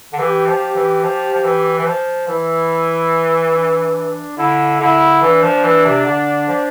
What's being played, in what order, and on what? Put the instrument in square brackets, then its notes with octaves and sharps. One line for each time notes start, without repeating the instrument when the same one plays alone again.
[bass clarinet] D3
[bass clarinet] E3 [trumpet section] G4
[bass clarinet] F3
E3
F3
F3
E3
E3
F3
[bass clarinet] E3 [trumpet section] E4
[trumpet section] D4
[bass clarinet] D3 [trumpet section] E4
[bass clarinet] D3 [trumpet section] E4
[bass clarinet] E3 [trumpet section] D4
[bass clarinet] F3
E3
C3
D3
F3